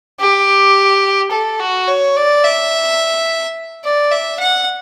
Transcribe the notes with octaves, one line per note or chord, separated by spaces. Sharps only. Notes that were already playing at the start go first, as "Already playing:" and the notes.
G4
A4
F#4
C#5
D5
E5
D5
E5
F#5